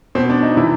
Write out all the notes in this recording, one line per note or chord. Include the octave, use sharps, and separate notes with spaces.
B2 C4
D4
D#4
C3 E3 E4